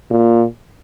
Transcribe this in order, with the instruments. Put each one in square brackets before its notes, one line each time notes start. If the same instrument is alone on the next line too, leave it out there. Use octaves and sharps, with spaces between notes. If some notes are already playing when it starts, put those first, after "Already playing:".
[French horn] A#2